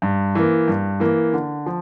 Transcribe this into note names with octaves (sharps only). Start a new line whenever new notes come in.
G2
E3 A#3
G2
E3 A#3
D3
F3